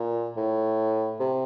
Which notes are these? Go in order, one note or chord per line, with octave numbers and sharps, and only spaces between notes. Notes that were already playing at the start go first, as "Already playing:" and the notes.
Already playing: A#2
A2
C3